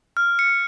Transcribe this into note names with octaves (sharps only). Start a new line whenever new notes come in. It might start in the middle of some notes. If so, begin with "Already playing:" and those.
F6
C#7